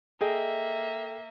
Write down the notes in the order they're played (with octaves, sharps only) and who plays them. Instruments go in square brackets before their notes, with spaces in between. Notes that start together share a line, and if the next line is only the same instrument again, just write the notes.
[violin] A#3 E5 [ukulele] G#4 D#5 [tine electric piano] A4 G5